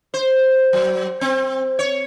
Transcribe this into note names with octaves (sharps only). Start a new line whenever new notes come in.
C5
F#3
C4
C#5